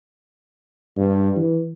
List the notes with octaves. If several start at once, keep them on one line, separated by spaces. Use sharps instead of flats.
G2
E3